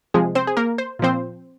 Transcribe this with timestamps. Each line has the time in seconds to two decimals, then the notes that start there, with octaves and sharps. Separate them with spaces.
0.14 C3 F3 G#3 G#4
0.35 C4 C5
0.47 G#4
0.57 A#3 A#4
0.78 C5
0.99 A#2 F3 C4 C5